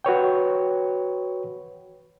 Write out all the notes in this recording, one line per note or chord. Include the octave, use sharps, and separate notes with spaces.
F#4 B4 C#5 G5